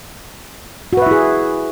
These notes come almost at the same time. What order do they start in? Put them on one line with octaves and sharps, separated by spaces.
F#4 B4 E5 E4 G#4